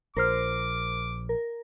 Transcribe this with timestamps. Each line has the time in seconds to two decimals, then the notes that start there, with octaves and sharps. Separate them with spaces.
0.17 A#1 A#4 C5 D6 F6
1.29 A#4